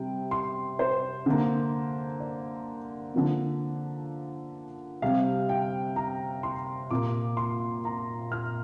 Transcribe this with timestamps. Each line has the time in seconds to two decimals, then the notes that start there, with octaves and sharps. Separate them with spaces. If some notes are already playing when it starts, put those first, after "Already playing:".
Already playing: C3 G3 C4 G5
0.31 C6
0.79 C5
1.26 D3 A#3
2.20 D5
3.14 D3 F3 A#3
5.02 C3 G3 C4 F5
5.49 G5
5.96 A#5
6.43 C6
6.91 A#2 A#3 D6
7.37 C6
7.85 A#5
8.32 F6